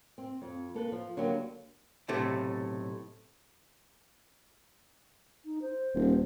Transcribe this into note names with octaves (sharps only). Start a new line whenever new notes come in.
C4
F2
A#3 A4 B4
F3
D3 F#3 A#3 B3 D4 G4
B1 A2 C3 A3
D#4
C5
D#1